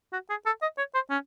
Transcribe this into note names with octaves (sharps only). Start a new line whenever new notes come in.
F#4
G#4
A4
D#5
C#5
C5
C#4